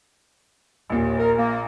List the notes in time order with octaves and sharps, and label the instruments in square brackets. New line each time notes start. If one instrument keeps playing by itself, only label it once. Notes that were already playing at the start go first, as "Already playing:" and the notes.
[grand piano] A#1 A#2 [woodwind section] D#2
[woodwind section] A#4
A#3